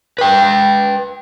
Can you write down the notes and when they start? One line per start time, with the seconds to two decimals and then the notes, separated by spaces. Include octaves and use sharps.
0.19 B4 G5